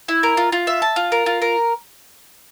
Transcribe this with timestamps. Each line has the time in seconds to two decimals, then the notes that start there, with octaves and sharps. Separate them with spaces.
0.08 E4
0.23 A#4
0.37 F4
0.52 F4
0.67 E5
0.82 A5
0.96 F4
1.12 A#4
1.26 F4
1.42 A#4